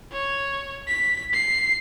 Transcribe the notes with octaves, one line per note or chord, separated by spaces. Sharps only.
C#5
B6
C7